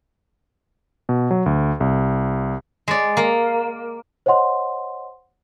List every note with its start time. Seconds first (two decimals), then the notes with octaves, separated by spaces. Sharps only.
1.09 B2
1.31 F#3
1.46 D2
1.80 C2
2.88 G#3 D5
3.17 A#3
4.26 C5 C#5 D#5 F#5 C6